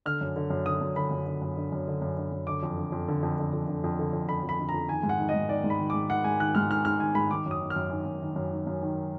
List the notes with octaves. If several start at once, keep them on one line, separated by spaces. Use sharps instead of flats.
D3 F6
F#2
D3
F#2
D3 D#6
F#2
D3 B5
F#2
D3
F#2
D3
F#2
D3
F#2
D3
F#2
D3 D6
F2
D3
F2
D3
F2
D3
F2
D3
F2
D3
F2
D3 B5
F2
B5
D3
A#5
F2
D#3 G#5
G#2
F#5
D#3
D#5
G#2
D#3 D5
G#2
B5
D#3
G#2 D6
D#3 F#5
G#2 G#5
D#3 F#6
G#2 F6
D#3 F6
G#2 F6
D#3 G#5
G#2 B5
D#3 D6
F#2
D#6
D#3
F6
F#2
D#3
F#2
D#3
F#2
D#3
F#2
D#3